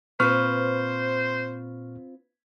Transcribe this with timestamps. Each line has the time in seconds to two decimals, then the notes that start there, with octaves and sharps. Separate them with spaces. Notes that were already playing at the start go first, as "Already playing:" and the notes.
0.20 A#2 C4 F4 B4 C5 C#6 F6